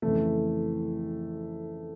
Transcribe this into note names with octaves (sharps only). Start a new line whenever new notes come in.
F2 C#3 E3 A3